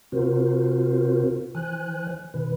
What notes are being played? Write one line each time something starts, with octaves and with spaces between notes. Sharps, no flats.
C3 C4 F4 F#4 A#4 C5
E3 C5 G#5 F#6
B2 D#3 B4